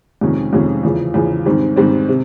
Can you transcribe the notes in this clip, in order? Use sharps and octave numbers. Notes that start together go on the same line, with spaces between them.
F2 C3 D#3 G#3 C#4
F2 C3 D#3 G#3 C#4
E2 C#3 F3
E2 C#3 F3
G#2 D#3 G3 C4
G#2 D#3 G3 C4
C3